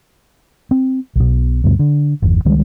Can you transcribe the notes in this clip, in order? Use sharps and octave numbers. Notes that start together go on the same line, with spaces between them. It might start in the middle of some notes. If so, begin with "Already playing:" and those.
C4
B1 B2
D2 G2 B2
D3
G1 E2
C#2 D#3 G3 G#3